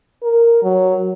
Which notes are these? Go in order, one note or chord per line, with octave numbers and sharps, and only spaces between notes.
A#4
F#3